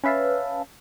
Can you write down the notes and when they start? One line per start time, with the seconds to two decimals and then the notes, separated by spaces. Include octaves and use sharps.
0.04 C#4 B4 E5 F5 A5